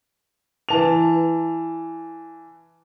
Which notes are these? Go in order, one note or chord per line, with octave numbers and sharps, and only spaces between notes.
E3 A5 F7